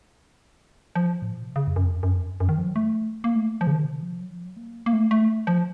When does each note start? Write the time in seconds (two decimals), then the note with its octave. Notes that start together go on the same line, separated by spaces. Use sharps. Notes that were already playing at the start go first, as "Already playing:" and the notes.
0.95 F3
1.22 A2
1.32 A#2
1.43 C3
1.56 C#3
1.67 F2
1.76 F#2
1.84 F2
2.03 F#2
2.16 F2
2.26 F#2
2.40 F#2
2.49 D#3
2.58 F3
2.67 F#3
2.76 A3
3.24 A#3
3.36 A3
3.61 F3
3.67 C#3
3.72 D#3
3.84 C3
4.03 F3
4.20 F#3
4.32 F3
4.45 F#3
4.57 A#3
4.86 A#3
4.93 A3
5.11 A3
5.47 F3